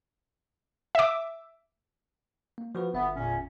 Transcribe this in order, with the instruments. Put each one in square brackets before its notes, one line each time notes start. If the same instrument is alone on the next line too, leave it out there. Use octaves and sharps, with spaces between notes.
[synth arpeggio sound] E5 D6
[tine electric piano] A#3
F3 F#4 B4
[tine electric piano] G1 E5 [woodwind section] B3
[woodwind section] E2 A#2 C#4